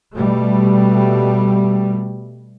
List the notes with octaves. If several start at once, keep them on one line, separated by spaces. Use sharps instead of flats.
B2 G3 A3